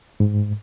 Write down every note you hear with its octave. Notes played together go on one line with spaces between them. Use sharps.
G#2